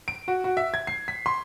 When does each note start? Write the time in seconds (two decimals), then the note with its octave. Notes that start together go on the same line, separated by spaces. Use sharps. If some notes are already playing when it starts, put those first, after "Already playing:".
0.08 D7
0.28 F#4
0.44 F#4
0.57 E5
0.74 G#6
0.87 C7
1.08 B6
1.26 C6